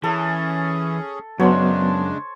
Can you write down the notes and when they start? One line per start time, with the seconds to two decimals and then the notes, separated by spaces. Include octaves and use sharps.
0.04 E3 C#4 G#4 A4
1.40 F#2 C#3 F#3 G#3 B3 D4 C5 C#5